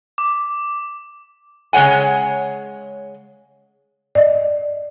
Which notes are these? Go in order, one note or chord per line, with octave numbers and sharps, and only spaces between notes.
D6
C#3 G#3 C#5 F#5 G#5
D5 D#5